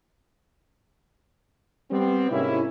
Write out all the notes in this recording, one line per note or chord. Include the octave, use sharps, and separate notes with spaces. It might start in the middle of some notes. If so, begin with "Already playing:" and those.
G3 B3 C4
G#2 C3 A#3 C#4 E4